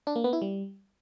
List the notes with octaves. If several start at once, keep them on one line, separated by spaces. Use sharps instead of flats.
D4
A#3
B3
E4
G3